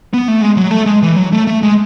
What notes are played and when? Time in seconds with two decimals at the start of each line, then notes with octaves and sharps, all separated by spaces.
0.14 B3
0.28 A3
0.40 G#3
0.57 F#3
0.71 A3
0.86 G#3
1.02 E3
1.16 F#3
1.32 A3
1.47 A3
1.63 G#3